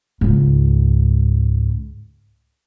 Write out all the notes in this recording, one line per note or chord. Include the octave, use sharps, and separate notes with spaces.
C#2 G#2